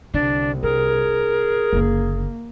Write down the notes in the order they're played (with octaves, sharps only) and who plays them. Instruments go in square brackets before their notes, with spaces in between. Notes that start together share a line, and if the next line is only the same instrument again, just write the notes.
[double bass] C2 [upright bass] D3 [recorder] D4
[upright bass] D4 [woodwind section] G#4 [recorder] A#4
[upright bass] F#1 D3 [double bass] A#3